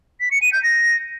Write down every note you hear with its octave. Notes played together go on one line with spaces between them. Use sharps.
B6
C#7
D#7
G6
A#6